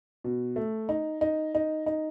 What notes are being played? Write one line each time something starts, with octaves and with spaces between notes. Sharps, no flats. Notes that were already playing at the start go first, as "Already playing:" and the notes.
B2
A3
D#4
D#4
D#4
D#4